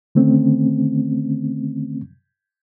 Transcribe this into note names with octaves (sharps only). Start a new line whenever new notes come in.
D3 D#3 A3 C4 C#4